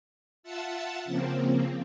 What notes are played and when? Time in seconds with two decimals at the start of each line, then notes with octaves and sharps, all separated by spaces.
0.43 F4 E5 F#5 A5 E6
1.05 C#3 F3 A#3 C4